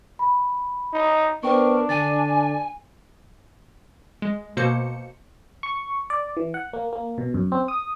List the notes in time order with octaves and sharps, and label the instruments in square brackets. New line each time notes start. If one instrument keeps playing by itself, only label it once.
[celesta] B5
[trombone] D#4
[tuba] B3 [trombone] D4 [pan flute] A#4 [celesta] C5 G5 C#6
[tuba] D3 [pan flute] G#5 [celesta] A6 D#7
[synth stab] G#3
B2 A#3 C5 C#7
[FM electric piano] C#6
D5
E3
F#5
A#3
A#3
B2
F#2
C4
D#6